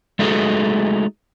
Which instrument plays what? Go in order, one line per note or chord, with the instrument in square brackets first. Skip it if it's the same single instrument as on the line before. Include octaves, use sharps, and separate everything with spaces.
[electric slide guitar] G#3 A3 D#4 F#4 G#4 A4